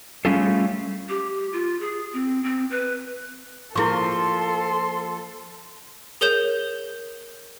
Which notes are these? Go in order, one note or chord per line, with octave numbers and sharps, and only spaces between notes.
G3 A3 C#4 F4 G#4 A4
G4
F4
G#4
C4
C4
B4
F3 A#3 E4 G#4 A4 C6 C#6
G#4 A#4 C#5 G6 E7